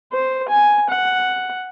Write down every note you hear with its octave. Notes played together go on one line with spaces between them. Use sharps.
C5
G#5
F#5